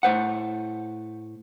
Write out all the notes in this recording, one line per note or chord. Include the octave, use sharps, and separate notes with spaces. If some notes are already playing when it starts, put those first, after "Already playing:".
A2 C5 F#5